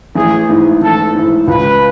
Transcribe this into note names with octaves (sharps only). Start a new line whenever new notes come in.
A1 G#4
G#2 E3
A1 A4
G#2 E3
C#2 B4